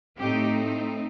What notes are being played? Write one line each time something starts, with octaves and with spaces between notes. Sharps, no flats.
A2 A3 C4 D#4 G4